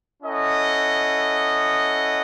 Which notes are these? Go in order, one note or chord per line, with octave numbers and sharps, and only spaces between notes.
C#4 E4 A4 D#5 F#5